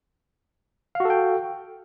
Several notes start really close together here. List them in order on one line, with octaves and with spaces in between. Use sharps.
F5 F#4 A4 G5